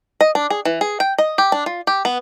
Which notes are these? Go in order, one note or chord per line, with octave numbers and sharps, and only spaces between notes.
D#5
D4
G#4
E3
G#4
G5
D#5
G4
D4
F4
G4
B3